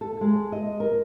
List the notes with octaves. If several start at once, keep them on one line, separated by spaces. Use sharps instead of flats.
A4
G#3
D#5
A#4